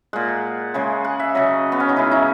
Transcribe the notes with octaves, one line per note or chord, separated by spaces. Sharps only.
A#2 G#3 F#5
C#3 G#3 G#5
F#5
E5
C#3 F#3 D#5
B3
C#4
D#4
C#3 G#3 E4
D#4